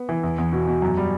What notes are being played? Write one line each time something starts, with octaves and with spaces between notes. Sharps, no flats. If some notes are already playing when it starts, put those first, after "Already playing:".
Already playing: B3
E3
E2
E2
B2
B2
F#2
G3